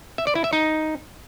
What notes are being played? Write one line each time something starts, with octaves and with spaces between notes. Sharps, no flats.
E5
D5
E4
E5
D#4